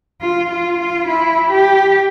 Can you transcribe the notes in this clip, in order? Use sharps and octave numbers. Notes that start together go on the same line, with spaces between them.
F4
F4
F4
E4
G4